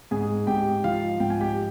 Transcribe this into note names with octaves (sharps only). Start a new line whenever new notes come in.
G#2 G#4 G#5
G#2 G4 G5
F3 F4 F5
G#2 G5
G#5
G4 G5